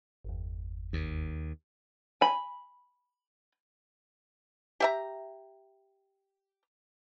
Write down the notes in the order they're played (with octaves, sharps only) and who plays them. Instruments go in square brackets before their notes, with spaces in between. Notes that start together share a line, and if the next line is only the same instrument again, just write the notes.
[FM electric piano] G1 E2
[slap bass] D#2
[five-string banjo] G#5 B5
[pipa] G4 E5 A#5